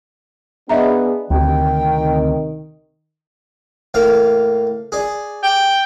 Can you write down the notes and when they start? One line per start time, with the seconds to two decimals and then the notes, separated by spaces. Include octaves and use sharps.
0.69 B3 D4 G#4 D#5 E5 A#5
1.30 D2 C3 D#3 G5
3.94 A2 A#3 F5
4.92 G#4 D5
5.43 G5